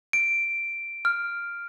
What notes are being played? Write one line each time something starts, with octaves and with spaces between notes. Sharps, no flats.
D7
F6